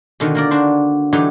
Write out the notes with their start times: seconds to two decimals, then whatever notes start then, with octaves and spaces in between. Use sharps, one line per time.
0.20 B2 D3 D#3
0.35 A#3 A#4 D5
0.51 D4 F#4 C5
1.13 D3 E3 F#3 D#4 G4